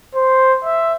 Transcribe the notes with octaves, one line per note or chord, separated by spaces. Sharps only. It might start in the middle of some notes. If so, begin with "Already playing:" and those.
C5
E5